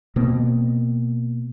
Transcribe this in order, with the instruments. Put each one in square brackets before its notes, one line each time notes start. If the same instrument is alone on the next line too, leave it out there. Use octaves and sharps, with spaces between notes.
[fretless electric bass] B2 A#3 C4